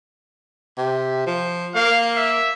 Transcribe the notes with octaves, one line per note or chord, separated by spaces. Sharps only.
C3
F3
A#3 F5
E5